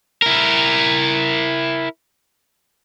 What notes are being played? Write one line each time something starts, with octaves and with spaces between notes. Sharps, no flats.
E4 A#4